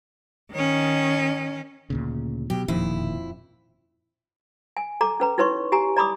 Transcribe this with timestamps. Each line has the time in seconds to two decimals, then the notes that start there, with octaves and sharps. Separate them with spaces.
0.52 D#3 C#4
1.90 D2 A#2 C#3
2.50 B2 F#3 G4
2.68 E1 F2 A#2 D#3 E4
4.77 G#5
5.01 A4 A#5 D6
5.20 C#4 B4 A#5
5.38 D#4 E4 B4 C#5 C6 C#6
5.72 G4 G#5 A#5
5.96 D5 A#5 B5 D6 D#6